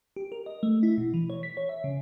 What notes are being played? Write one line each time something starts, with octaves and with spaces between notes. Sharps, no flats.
G4
A#4
D#5
A3
E4
B2
E3
C#5
B6
C#5
E5
C#3